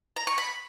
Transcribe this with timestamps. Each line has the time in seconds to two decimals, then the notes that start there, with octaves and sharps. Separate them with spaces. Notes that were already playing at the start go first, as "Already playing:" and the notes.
0.16 A#5
0.27 C#6
0.38 B5